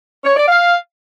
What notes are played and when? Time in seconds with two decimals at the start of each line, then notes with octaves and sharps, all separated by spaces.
0.24 C#5
0.36 D5
0.48 F5